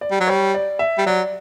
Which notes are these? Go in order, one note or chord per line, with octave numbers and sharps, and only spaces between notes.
D5
G3
F#3
G3 C#5
D5
E5
G3
F#3 D5